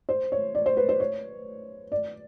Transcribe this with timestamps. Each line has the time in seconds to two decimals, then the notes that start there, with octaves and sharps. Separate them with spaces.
0.09 C5
0.32 C#5
0.55 D5
0.66 C5
0.77 B4
0.89 C5
1.00 C#5
1.92 D5